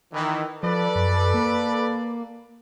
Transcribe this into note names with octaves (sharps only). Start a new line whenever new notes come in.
D#3 E3
F3 A4 B4 D5
F#2
A#3